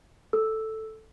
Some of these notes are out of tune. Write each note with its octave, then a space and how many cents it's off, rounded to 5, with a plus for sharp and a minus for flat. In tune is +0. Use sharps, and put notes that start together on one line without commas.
A4 +0 E6 +0